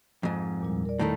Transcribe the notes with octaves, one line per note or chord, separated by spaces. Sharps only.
F2 G#2
E2 A#2 G3
A#4 D5
A2 D#3 A3